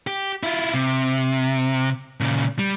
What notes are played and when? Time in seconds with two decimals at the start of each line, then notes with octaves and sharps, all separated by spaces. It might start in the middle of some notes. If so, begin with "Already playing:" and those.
0.07 G4
0.43 E4 F4
0.74 C3
2.20 A#2 C#3
2.59 G3